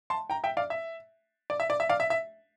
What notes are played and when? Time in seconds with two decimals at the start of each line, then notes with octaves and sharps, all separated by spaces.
0.10 A5 C6
0.30 G5 A#5
0.44 E5 G5
0.57 D5 F5
0.70 E5
1.50 D5
1.60 E5
1.70 D5
1.80 E5
1.89 D5 F5
2.00 E5
2.10 E5